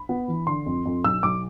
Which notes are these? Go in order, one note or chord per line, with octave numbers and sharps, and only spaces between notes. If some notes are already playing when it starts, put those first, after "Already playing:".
Already playing: B5
B3
E3
D3 C6
F2
F2
B1 E6
B1 D6